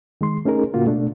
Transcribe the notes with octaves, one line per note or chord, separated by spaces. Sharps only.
D#3 G#3 C6
A3 C#4 D#4 G#4 A#4
A2 C#3 A#3 F4 F#4
B2 A3 D4